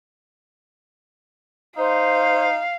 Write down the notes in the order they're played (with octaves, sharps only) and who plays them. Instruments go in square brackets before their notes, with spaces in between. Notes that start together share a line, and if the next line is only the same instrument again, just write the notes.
[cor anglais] D#4 [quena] C5 [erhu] F5